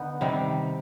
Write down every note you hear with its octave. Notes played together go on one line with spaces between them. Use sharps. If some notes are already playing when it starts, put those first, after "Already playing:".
Already playing: D3 B3 D#4
C3 D#3 G3